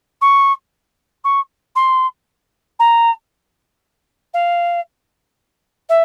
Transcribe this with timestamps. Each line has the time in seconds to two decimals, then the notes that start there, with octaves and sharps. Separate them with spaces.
0.21 C#6
1.24 C#6
1.75 C6
2.79 A#5
4.33 F5
5.89 E5